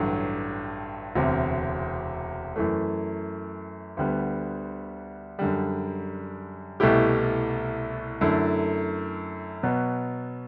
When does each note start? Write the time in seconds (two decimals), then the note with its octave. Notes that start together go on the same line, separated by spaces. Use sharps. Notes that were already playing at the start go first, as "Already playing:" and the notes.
Already playing: A1 G2 D3 F#3
1.15 E1 D2 C3
2.56 F#2 E3 A3
3.97 D2 D3 G3 B3
5.39 F#2 D3 G3
6.80 C2 B2 A3 E4 G4
8.21 F#2 D3 A3 E4
9.63 B2 F#3 B3